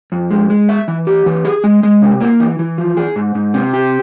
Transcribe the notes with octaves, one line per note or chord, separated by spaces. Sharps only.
F2
G#3
G#3
E5
E3
G4
E3
G#4
G#3
G#3
C3
A#3
E3
E3
F3
G#4
G#2
G#2
C3
G4